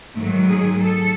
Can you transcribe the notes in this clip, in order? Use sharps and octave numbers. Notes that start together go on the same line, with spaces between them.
G#2 D#3 F#3 A3
G#4
A4